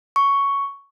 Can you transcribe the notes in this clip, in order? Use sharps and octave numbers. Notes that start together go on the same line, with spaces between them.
C#6